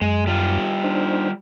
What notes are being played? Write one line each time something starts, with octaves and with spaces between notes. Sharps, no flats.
F#2 G#3
G3 F4
D4 D#4 C5